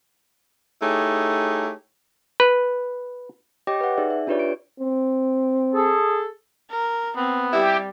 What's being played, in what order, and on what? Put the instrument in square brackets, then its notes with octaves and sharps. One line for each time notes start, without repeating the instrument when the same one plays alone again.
[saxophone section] A3 D#4 E4 G4 G#4 C#5
[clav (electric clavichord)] B4
[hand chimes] G4 C#5 D#5 G5 D6 A#6
B4 F#5
D#4 G#4 D5 E5
E5
D4 F4 G4 B4 C#5 D5
D7
[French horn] C4
[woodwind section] G#4 A4
[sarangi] A#4
[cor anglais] B3 [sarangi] C4
[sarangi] G3 [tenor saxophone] E4 [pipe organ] G4